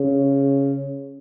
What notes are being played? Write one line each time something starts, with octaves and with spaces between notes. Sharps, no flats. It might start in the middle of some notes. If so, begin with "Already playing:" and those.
Already playing: C#3